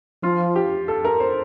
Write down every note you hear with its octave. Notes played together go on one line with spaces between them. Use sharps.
F3 F4
G4
A4
A#4
C5